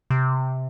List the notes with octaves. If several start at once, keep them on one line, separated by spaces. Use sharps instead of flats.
C3